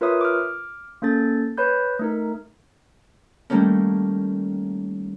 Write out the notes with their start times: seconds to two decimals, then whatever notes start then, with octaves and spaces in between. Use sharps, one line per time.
0.01 F4 A#4 B4 C#5 E5 D#6
0.21 D6 F6
1.02 A#3 C#4 A4 A6
1.58 B4 C#5 B5 G6
1.99 A3 D#4 A#4
3.50 D#3 G3 A3 A#3 C#4